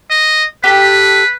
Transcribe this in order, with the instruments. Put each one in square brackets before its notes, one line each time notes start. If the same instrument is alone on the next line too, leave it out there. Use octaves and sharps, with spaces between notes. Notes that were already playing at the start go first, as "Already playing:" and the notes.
[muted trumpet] D#5
[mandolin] G4 A4 A5 [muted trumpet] B4